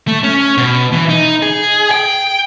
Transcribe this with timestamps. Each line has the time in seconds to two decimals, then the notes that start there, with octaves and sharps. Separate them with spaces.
0.08 A3
0.24 C#4
0.57 B2
0.92 E3
1.09 D#4
1.43 G#4
1.91 G5